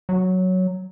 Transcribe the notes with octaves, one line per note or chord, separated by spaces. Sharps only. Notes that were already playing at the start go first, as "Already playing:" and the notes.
F#3